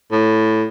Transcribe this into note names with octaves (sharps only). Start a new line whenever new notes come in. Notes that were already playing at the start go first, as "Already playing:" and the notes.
A2